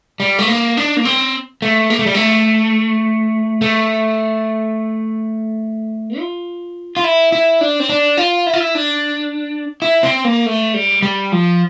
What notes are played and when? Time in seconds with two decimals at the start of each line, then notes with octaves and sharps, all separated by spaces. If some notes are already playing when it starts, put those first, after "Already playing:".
0.20 G3
0.39 A3
0.48 A#3
0.77 D4
0.97 A#3
1.05 C4
1.62 A3
1.90 A#3
1.99 A3
2.06 G3
2.14 A3
3.62 A3
6.18 F4
6.97 F4
7.04 E4
7.32 E4
7.61 D4
7.80 C4
7.89 D4
8.17 F4
8.47 E4
8.53 F4
8.60 E4
8.75 D4
9.82 E4
10.03 C4
10.25 A#3
10.46 A3
10.74 G3
11.02 G3
11.32 F3